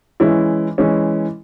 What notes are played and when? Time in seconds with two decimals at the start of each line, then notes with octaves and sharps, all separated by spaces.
0.20 E3 G#3 C#4 E4
0.78 E3 G#3 C#4 E4